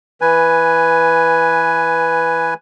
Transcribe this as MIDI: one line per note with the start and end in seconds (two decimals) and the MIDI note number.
0.21 2.54 52
0.21 2.54 71
0.21 2.54 80